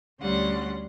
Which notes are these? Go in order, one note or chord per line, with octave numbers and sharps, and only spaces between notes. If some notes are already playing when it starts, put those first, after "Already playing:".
D2 G3 C#4 F#5 C6